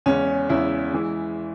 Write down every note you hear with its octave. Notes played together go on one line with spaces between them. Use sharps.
E2 C#3 G#3 C#4
E2 C#3 G#3 E4
E3 G#3